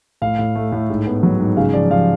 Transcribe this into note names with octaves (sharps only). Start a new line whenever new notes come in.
A2 F5
A2
A3
A2
G#2
B3
F#3
G#2
C#3 F5
F3 D5
F3 F5